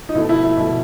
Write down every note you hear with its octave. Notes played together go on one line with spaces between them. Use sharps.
D#4
B2 A3 E4
E4
E4
B2 A3